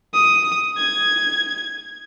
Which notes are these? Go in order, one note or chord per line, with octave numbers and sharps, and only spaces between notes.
D#6
G#6